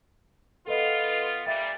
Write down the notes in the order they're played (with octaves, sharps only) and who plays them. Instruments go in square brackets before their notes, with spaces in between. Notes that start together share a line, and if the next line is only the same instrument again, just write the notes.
[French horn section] B3 F4 [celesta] A4 B4 D#5
[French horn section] A#2 G3 [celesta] E5 G5 A6